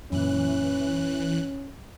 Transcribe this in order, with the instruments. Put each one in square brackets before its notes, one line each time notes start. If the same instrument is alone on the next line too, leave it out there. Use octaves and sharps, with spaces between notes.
[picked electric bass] F#2 A#2 [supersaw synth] E3 F#6 [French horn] C#4